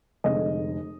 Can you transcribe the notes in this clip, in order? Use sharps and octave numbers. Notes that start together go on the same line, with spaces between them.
F1 F2 D3 G#3 D#5